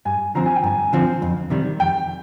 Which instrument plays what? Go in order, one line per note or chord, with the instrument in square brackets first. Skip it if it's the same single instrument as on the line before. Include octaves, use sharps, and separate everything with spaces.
[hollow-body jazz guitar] G2 [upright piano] G#5
[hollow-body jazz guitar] D3 F3 C4 [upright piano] A#5
[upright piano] G#5
G5
[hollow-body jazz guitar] G2 [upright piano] G#5
[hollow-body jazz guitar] D3 F3 C4
F2
C3 D#3 G3
[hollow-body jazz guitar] F2 [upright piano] G5